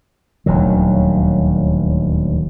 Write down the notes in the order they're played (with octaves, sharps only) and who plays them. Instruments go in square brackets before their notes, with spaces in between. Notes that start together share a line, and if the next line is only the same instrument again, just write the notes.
[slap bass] D#1 D2 D#3 F#3